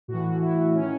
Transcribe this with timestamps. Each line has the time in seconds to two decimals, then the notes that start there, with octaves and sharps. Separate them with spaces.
0.08 A2 F#4
0.13 E3
0.41 E4
0.75 D#3 C#4